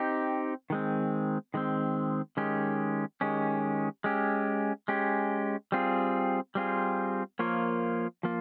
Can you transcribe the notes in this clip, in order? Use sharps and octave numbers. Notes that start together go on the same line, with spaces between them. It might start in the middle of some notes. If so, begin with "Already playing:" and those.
Already playing: C4 D#4 G4
D#3 G#3 C4
D#3 G#3 C4
D#3 G#3 C#4 G4
D#3 G#3 C#4 G4
G#3 C#4 G4
G#3 C#4 G4
G3 C4 F4 G#4
G3 C4 F4 G#4
F3 A#3 F4 A#4 C#5
F3 A#3 F4